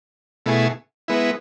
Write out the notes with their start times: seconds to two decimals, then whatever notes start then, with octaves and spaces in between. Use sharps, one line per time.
0.46 B2 A3 E4 G#4
1.08 G#3 B3 E4